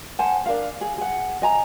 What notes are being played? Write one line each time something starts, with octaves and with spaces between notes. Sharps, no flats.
C5 F#5 G#5 A5
D4 A#4 F5
G#4
G#4 F#5
D#5 G#5 A#5